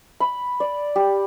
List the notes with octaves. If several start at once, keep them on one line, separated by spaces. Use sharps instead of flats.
B5
D5
G4